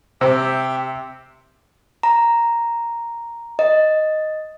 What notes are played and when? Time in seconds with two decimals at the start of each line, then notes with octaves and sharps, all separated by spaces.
0.21 C3 G4 C5 E5 G5
2.03 A#5
3.59 D#5